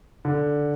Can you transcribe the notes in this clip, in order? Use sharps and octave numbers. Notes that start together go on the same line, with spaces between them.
D3